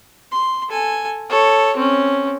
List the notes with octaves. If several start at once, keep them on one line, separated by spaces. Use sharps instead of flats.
C6
A4 G#5
A4 C#5
C4 C#4